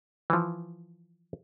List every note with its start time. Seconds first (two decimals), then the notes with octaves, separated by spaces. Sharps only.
0.30 E3 F3